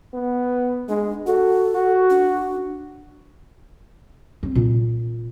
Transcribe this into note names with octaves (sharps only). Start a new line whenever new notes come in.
B3
G#3 D4
F#4 A4
F#4
D4
C4
A#2